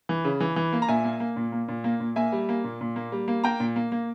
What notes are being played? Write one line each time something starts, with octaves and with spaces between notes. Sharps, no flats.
E3
C#3
E3
E3
A#3
A#5
A#2 E5 G#5
A#3
A#3
A#2
A#3
A#2
A#3
A#2
A#3 E5 G#5
G3
A#3
A#2
A#2
A#3
G3
A#3
A#3 G5 A#5
A#2
A#3
A#3